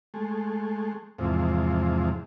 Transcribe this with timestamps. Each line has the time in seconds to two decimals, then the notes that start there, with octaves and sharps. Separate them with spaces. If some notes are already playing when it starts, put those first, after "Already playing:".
0.14 G#3 A3
1.19 E2 G#2 C3 F3